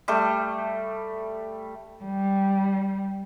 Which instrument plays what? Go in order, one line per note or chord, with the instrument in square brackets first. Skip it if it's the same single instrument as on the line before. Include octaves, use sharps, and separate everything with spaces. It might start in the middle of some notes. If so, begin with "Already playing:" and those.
[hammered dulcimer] G3 A3
[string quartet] G3